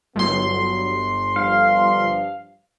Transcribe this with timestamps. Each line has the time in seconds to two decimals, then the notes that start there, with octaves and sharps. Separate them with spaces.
0.16 G1 F#3 B3 C6
1.36 G2 F3 F5